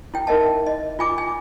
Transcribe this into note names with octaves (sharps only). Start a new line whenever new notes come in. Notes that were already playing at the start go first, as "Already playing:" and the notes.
E4 G5
D#4 A#4 D#5 E5 A5
D#5
F4 G#5 D6
G#5